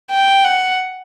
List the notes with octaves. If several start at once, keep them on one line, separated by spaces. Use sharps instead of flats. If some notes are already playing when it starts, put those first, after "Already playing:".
G5
F#5